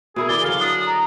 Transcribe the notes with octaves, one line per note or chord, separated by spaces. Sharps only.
B2 E4 G#4 A#4
E3 G#4 D5 G7
D3 F#3 F5
D4 D#6
A#5